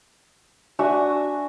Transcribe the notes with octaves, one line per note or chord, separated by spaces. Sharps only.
D4 F#4 E5 G#5